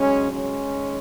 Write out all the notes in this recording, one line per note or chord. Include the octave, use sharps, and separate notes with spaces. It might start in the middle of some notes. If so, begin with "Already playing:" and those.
Already playing: D#2 C#3 F#3 G#3 C#4
G#3 C#4
D#2